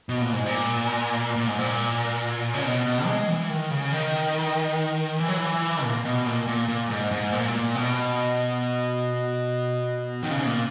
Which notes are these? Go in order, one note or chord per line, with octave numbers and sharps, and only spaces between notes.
B2
A#2
G#2
A#2
A#2
G#2
A#2
C#3
B2
B2
G#3
E3
D#3
C#3
D#3
E3
F#3
E3
A#2
B2
A#2
A#2
A#2
G#2
G#2
A#2
A#2
B2
D#3
C#3
A#2